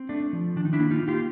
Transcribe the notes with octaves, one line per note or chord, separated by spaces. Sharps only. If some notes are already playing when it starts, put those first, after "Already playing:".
Already playing: C4
A3 D4
F3
D#3 D4
D#4
D4 E4
A#3
D#4 F4
A#3
F4 G4